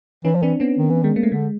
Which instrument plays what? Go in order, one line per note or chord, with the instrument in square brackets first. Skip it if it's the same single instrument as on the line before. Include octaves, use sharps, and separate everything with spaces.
[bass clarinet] E3 [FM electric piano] C#4 D#4
[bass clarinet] F3
[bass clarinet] E3 [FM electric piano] C4 D4
[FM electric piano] B3 C#4
[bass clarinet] D#3
E3
[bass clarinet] D#3 [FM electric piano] G#3
[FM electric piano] A#3
A3
[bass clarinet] D3 [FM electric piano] G#3